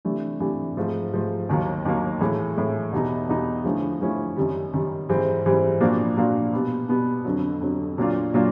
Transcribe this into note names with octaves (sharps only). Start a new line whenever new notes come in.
C3 E3 A3 D4
C3 E3 A3 D4
G#2 F3 A3
G#2 F3 A3
D#2 D#3 F#3 A#3
D#2 D#3 F#3 A#3
A2 E3 G#3
A2 E3 G#3
E2 B2 G3 B3 D#4
E2 B2 G3 B3 D#4
D3 F3 A3 C#4 E4
D3 F3 A3 C#4 E4
F#2 D#3 G3
F#2 D#3 G3
G#2 E3 G3 C4
G#2 E3 G3 C4
A#2 F3 A#3 D4 F#4
A#2 F3 A#3 D4 F#4
B2 G3 B3
B2 G3 B3
F2 D3 F#3
F2 D3 F#3
A#2 F#3 A#3 D4 F4
A#2 F#3 A#3 D4 F4